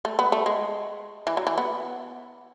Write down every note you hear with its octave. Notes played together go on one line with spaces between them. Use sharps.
A3
B3
A3
G#3
E3
F#3
E3
B3